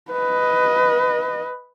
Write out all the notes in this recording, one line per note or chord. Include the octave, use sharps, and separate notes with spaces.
B4 D#5